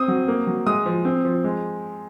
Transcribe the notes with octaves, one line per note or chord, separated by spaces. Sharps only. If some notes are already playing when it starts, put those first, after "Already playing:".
Already playing: C4 D#6
F#3
A#3
F#3
G#3 D#6
F3
C4
F3
G#3